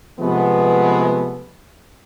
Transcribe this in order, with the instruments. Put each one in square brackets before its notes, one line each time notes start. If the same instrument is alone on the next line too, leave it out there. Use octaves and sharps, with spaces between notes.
[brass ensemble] C3 F3 G#3 A3 B3